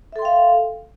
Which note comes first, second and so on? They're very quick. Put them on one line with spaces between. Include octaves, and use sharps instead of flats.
E5 A4 C6 G5 F5